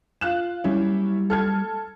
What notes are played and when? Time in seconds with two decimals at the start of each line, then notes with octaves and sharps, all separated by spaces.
0.21 F4 F#6 E7
0.64 F#3 G3 A#3 C#4 E4
1.30 A4 F6 G#6